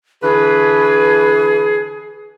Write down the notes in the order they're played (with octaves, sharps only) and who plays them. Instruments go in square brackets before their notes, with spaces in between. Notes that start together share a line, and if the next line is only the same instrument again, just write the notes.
[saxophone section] D3 E3 B4 [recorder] G#4